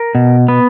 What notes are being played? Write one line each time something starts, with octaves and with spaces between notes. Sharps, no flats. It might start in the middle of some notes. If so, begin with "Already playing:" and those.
Already playing: A#4
B2
B3